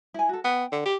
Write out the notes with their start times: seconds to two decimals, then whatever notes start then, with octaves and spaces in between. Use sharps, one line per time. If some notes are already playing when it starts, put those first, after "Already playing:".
0.14 E4 G#5
0.29 F#4 A4
0.44 B3 G5
0.72 D3
0.85 G4